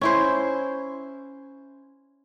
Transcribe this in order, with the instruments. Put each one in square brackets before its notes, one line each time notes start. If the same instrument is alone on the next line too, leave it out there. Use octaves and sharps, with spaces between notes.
[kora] C#4 E4 C5